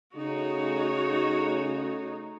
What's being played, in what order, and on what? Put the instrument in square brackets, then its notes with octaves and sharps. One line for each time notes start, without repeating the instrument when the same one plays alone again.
[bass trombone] C#3 [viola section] A3 D#4 [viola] F#4 C#5